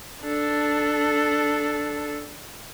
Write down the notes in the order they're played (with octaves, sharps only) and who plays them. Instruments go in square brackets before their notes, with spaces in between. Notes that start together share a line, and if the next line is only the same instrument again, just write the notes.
[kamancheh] D4 A4